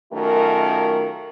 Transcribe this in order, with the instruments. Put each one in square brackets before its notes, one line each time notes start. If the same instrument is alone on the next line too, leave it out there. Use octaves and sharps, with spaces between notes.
[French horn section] F#2 D#3 A3 F4 A#4